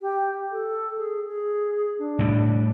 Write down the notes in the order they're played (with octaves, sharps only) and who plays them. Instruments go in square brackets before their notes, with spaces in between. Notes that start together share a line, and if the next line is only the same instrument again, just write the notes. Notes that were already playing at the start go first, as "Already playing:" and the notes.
[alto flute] G4
A4
G#4
G#4
D4
[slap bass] A2 G3